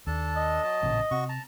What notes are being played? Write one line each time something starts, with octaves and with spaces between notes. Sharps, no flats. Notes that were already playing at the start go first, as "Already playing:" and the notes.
D#2 D4 A4 A5
D#5
F#3 A5
A1 A#2 C#3
C3 F#4 C#6
A5 A#5